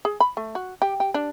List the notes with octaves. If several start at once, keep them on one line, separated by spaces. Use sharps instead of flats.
G#4
B5
A3
F#4
G4
G4
D4